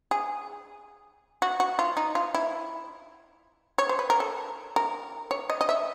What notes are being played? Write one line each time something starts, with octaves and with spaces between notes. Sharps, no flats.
G#4
F#4
F#4
F4
D#4
F4
E4
C#5
C5
B4
A#4
A4
A#4
C#5
D#5
D#5
E5